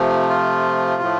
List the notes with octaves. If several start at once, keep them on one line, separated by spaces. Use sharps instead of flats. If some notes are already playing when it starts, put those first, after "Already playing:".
Already playing: C3 F3 A3
F4
A2 F3 A3